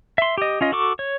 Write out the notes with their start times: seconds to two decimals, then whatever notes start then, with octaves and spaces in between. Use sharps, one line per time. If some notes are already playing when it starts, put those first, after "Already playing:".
0.18 E5 C6
0.38 G4 D#5
0.61 C#4 F4 D#5
0.72 F#4 A4 C#6 D6
0.99 C#5